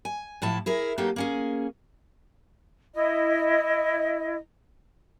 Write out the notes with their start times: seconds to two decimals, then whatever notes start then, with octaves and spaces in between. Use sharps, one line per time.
0.05 G#5
0.42 A2 F3 E4 A5
0.66 E4 G#4 A#4
0.98 F#3 A#3 D#4 G4 A4
1.16 A#3 C#4 G#4
2.94 E4 D#5